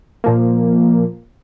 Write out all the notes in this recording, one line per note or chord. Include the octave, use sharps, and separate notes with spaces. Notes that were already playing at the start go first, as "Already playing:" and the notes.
A#2 F3 A#3